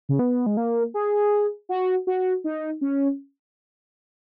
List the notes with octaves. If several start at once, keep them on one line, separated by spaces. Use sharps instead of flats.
C#3
B3
G#3
A#3
G#4
F#4
F#4
D#4
C#4